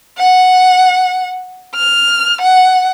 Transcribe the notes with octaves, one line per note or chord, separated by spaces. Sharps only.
F#5
F6
F#5